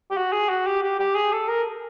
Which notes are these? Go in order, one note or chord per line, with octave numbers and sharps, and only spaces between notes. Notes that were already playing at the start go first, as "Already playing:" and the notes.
G4
F#4
G#4
F#4
G4
G4
G4
G#4
A4
A#4